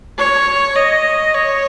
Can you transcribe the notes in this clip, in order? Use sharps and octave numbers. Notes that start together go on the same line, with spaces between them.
C#5
D#5
C#5